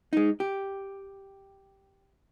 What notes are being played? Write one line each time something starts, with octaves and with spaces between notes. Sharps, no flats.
G#3 D#4
G4